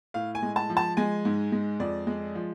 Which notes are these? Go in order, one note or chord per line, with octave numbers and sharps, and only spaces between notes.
A2 F5
G#5
G#3
A5
F3
A5
G#3 G#5
G#2
G#3
F2 D5
G#3
F3